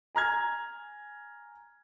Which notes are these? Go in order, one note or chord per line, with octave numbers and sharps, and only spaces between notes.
G#5 A#5 F6 G#6